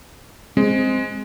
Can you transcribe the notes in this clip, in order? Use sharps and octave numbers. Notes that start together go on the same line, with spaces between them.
G#3 C4